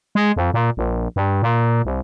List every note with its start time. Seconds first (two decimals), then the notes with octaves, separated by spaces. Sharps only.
0.15 G#3
0.36 F2
0.54 A#2
0.77 A#1
1.16 G2
1.43 A#2
1.85 C2